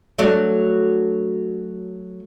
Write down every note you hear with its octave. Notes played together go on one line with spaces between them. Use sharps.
F#3 A3 D4